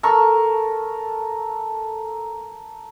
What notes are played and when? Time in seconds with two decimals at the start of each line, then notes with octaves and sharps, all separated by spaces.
0.03 A4 A#4 C#6